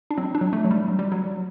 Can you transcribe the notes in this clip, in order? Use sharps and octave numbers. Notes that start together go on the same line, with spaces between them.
D4
F#3 C4
D4
F#3
A3
F#3
G3
F#3
G3
F#3